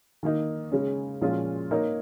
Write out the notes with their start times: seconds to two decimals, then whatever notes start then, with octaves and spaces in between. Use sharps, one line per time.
0.23 D#3 A#3 D#4
0.72 C#3 G#3 C#4
1.21 A#2 F3 G#3 C#4 F4
1.71 A#3 D#4 A#4 C#5